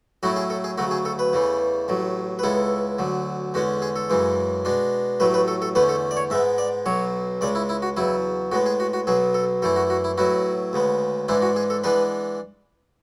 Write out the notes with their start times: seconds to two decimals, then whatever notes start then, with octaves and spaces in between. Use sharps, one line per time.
0.23 A2 F#3 A3 E4 F#4
0.36 G#4
0.50 A4
0.64 G#4
0.78 D2 C#3 F#3 A3 F#4
0.91 G#4
1.05 A4
1.19 B4
1.33 E2 C#3 E3 A3
1.88 A1 A2 F#3
2.39 B4
2.43 C#2 C#3 G#3 B3 E4 A4
2.99 D2 D3 F#3
3.54 E2 D3 G#3 C#4 F#4
3.82 G#4
3.96 A4
4.10 F#2 C#3 E3 G#3
4.65 B2 G#3 D4
5.20 A1 A2 F#3 A3 B4
5.34 B4
5.48 A4
5.62 A4
5.75 E2 D3 A3 C#4 B4
5.89 A4
6.11 D5
6.17 C#5
6.30 G#2 G#3 B3 E5
6.58 D5
6.86 B1 B2 F#3 C#5
7.41 C#2 C#3 G#3 D5
7.55 E4
7.69 E4
7.82 F#4
7.97 E2 C#3 F#3 E4
8.52 A2 G#3 B3 F#4
8.66 G#4
8.80 F#4
8.93 F#4
9.07 B1 B2 F#3 B3 G#4
9.34 A4
9.62 F#2 E3 A3 E4 A4
9.76 F#4
9.90 F#4
10.04 E4
10.18 A2 F#3 B3 E4 F#4
10.73 D2 C#3 G#3 B3
11.28 G#2 E3 G#3 D4 E4
11.42 F#4
11.56 G#4
11.70 A4
11.84 E3 G#3 B3 D4 B4